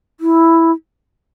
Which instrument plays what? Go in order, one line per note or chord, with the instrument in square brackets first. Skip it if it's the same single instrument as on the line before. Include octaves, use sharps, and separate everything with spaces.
[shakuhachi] E4